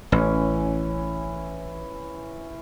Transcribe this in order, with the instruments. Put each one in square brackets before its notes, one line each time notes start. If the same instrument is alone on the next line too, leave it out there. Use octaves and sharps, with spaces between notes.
[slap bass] A1 [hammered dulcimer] E3 C#4